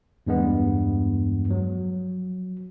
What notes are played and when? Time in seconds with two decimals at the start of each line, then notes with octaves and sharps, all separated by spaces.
0.27 E2 G2 G#3 B3
1.51 F#3